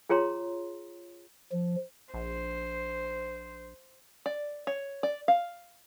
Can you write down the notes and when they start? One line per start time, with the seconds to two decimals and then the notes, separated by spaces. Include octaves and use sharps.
0.09 F4 G#4 C#5 A#5 C6
1.52 F3
2.14 A#1 C5
4.26 D5
4.67 C#5
5.03 D5
5.28 F5